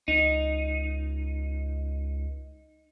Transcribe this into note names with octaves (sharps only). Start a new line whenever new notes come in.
C#2 D#4